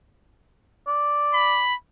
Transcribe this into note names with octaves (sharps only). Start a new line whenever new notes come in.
D5
B5